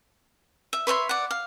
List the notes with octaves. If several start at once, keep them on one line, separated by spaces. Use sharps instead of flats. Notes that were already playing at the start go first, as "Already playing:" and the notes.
E5
B4 C#5 E5 C6
D5 F#5
F5